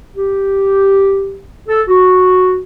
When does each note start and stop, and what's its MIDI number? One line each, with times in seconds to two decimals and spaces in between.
0.16 1.41 67
1.68 1.81 69
1.88 2.61 66